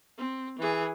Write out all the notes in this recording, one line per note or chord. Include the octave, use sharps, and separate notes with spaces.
C4
E3 G#4